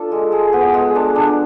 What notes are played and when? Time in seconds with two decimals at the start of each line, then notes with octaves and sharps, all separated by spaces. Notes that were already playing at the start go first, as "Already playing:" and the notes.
Already playing: D4 F4 A4
0.12 G#3
0.32 G#3
0.53 B3
0.74 G#3
0.96 D4
1.16 D4